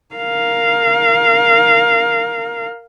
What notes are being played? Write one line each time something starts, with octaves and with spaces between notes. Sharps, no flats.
A#4 F5